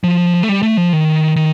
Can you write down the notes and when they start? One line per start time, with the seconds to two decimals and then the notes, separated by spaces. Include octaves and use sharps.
0.04 F3
0.43 A3
0.49 G3
0.63 A3
0.77 F3
0.93 D#3
1.36 D#3